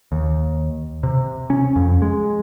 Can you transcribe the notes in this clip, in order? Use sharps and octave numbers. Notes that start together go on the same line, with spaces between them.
D#2
C3
C#4
F2
G#3